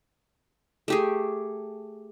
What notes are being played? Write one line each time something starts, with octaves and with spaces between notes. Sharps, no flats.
A3 G4 G#4